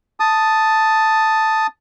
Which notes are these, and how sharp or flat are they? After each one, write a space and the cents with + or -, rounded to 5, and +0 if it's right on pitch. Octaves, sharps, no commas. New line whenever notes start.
A5 +0 D#6 +0